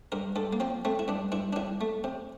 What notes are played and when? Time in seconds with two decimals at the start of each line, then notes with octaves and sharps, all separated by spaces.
0.12 G2 A#4
0.36 G2 A4
0.53 A#3
0.60 F3 C4
0.85 A3 C4
0.99 E4
1.08 G2 D4
1.32 G2 E4
1.53 D4
1.56 C2 E4
1.81 A3
2.04 C3